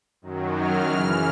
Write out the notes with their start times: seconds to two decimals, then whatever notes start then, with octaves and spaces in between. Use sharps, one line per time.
0.22 F#2 D#3 F#3
0.56 F6
0.90 F#2 C#3 E3